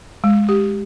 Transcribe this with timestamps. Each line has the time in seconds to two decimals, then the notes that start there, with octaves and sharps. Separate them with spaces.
0.24 G#3
0.49 G4